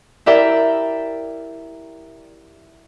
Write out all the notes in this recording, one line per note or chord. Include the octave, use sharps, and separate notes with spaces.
E4 G4 A#4 D5 E5 G5